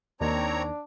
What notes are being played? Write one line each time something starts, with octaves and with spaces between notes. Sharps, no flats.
D#2 D#3 C4 D4 C#5 A#5